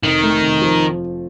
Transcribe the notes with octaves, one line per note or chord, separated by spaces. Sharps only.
F1 D#3
A3
F1
F3